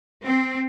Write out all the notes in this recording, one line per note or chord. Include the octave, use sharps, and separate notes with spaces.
C4